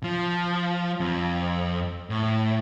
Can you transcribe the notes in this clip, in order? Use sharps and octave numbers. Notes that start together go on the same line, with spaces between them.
F3
F2
A2